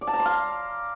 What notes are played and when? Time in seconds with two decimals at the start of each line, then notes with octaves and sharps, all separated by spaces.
0.01 D5
0.07 A5
0.13 A#5
0.19 C6
0.25 F5